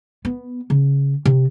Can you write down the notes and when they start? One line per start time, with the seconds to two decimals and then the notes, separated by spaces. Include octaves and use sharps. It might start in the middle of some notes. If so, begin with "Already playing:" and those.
0.25 B3
0.70 C#3
1.25 C3